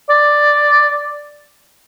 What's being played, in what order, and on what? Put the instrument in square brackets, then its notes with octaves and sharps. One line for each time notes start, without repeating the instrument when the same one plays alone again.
[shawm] D5